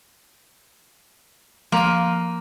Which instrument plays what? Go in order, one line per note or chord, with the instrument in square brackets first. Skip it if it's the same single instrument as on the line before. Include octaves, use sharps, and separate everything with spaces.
[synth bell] F3 D#7 [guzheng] A#3